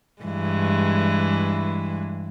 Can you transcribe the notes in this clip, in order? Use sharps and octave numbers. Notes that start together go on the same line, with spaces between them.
G2 E3 G#3